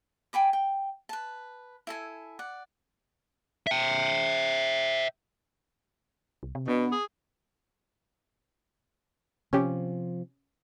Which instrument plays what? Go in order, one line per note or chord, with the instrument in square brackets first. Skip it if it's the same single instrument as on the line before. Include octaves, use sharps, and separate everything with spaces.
[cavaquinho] G5 G#5 B5 D6
G5
B4 A5
E4 A4 G#5
D5 F#5
[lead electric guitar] E5 G5
[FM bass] C2
C3
[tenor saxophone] B2 [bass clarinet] B3 [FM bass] D4
[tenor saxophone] G#4
[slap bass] C3 F3 [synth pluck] C#4 G4